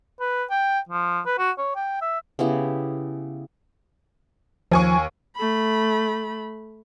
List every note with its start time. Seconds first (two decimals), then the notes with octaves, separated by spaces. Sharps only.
0.20 B4
0.50 G5
0.89 F3
1.26 B4
1.38 F#4
1.58 C#5
1.75 G5
2.01 E5
2.39 C#3 B3 E4 G4
4.72 D#2 F3 G#5 C#6
5.36 A3 B5